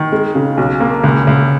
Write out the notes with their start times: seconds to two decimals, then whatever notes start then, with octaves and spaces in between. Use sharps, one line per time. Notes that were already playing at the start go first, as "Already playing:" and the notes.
Already playing: D#3
0.12 G#3
0.35 C#3
0.57 B1
0.80 A#3
1.04 C#2
1.27 C#2